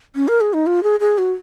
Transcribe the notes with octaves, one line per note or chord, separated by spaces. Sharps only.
C#4
A#4
G#4
D#4
F4
G#4
G#4
F#4